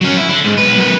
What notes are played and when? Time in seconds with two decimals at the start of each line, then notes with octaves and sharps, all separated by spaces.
0.01 F#3 C#4
0.17 E4
0.29 D3
0.45 G#2
0.58 B1 B4
0.78 F#2 B4